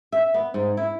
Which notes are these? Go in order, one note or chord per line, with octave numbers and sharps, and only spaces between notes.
E5
B3
G#2
E4